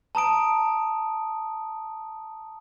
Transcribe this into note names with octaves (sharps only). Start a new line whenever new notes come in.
A5 A#5 D#6 D7